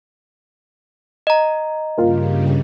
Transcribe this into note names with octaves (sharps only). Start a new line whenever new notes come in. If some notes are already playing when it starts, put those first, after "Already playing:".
D#5 A#5
G2 C#3 G3 A#3 F4